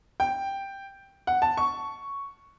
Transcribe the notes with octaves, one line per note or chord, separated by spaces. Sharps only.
G5
F#5
A5
C#6